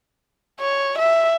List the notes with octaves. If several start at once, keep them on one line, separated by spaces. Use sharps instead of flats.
C#5
E5